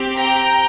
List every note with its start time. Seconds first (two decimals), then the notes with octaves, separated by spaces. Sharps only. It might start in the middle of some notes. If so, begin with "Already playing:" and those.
Already playing: C4 G4
0.17 G5 A#5